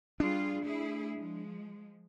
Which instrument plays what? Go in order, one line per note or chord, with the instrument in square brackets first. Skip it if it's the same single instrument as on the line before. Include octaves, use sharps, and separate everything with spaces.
[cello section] G3 F4 G#4 [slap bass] D4
[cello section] A3 E4 G#4
F3 G#3